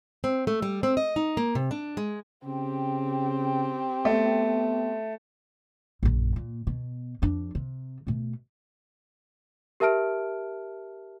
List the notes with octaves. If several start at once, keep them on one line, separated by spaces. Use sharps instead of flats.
C4
A3
G3
C4
D#5
D#4
A#3
C3
D4
G#3
C#3 C4 G4
A3 B3
A#1 F#2
A#2
B2
F2 D4
C3
B2 A3
G4 A#4 E5 A5 F6 D7